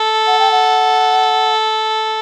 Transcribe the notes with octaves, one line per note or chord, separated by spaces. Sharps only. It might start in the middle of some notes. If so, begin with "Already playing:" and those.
Already playing: A4
F#5
G5
F#5